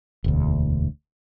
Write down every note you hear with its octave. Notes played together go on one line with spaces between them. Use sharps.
E1 D2